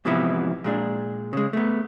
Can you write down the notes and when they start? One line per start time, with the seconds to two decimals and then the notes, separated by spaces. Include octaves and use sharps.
0.05 G#2 C3 E3 F3 B3 E4
0.64 A#2 G#3 D4
1.33 C#3 G#3
1.53 A3 B3